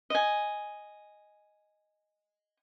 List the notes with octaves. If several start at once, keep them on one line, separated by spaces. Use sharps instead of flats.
D#5 G#5